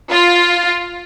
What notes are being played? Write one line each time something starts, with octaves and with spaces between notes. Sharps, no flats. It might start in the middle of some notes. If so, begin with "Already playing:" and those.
F4